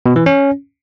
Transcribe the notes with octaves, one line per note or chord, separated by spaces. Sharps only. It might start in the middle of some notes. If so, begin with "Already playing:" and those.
B2
E3
C#4